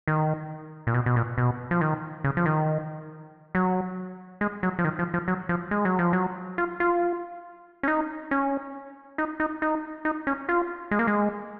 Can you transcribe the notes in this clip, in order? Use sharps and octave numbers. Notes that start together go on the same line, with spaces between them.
D#3
A#2
B2
B2
A#2
B2
F3
D#3
C#3
F3
D#3
F#3
G#3
F#3
F3
D#3
F3
F3
F#3
F3
G#3
F#3
F3
F#3
F4
F4
C#4
D#4
C#4
D#4
D#4
D#4
D#4
C#4
F4
G#3
A#3
G#3